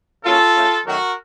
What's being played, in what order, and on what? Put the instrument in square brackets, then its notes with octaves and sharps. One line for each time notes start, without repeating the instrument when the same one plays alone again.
[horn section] C#3 F#3 A#3 C#4 F4 A4
C#3 A3 C#4
F#2 D#3 F#3 A3 F#4 A#4